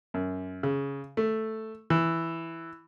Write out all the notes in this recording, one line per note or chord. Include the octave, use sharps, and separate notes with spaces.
F#2
C#3
A3
E3